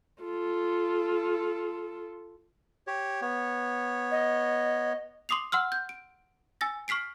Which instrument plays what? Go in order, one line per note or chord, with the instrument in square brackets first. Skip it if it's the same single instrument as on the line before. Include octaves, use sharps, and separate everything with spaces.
[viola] F4 A4
[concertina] G4 C#5
B3 C#5
[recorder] D#5
[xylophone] C6 D6 D#6 C7 F7
F#5 C6 E6 F6
G6
D7
G#5 E6 A6 A#6
C#6 F6 B6 C7 D7